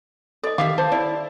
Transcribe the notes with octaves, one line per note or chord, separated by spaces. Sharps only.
A4 D5 D#5
D#3 G4 E5 F5 D6
C5 A5
E4 D5